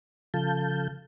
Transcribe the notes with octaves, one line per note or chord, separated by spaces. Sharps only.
C#3 F3 A4 F5 A5 G6